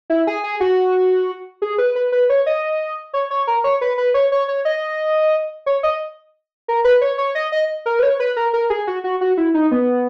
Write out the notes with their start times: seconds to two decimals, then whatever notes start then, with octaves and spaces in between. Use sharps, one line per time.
0.10 E4
0.27 G#4
0.44 G#4
0.60 F#4
1.62 G#4
1.78 B4
1.96 B4
2.12 B4
2.30 C#5
2.46 D#5
3.13 C#5
3.30 C#5
3.47 A#4
3.64 C#5
3.81 B4
3.98 B4
4.14 C#5
4.32 C#5
4.48 C#5
4.65 D#5
5.66 C#5
5.83 D#5
6.68 A#4
6.84 B4
7.01 C#5
7.18 C#5
7.35 D#5
7.52 D#5
7.86 A#4
7.99 B4
8.03 C#5
8.20 B4
8.36 A#4
8.53 A#4
8.70 G#4
8.87 F#4
9.04 F#4
9.21 F#4
9.37 E4
9.54 D#4
9.71 B3